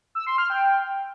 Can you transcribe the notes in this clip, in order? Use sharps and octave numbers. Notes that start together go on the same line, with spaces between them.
E6
C6
F6
G5